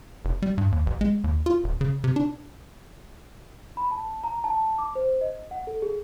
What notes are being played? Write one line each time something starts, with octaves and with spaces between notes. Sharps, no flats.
F1
G3
G2
D#2
A1
G#3
D#2
F4
D#1
C#3
C3
D4
B5
A5
A#5
A5
D6
C5
D#5
F#5
A4
G#4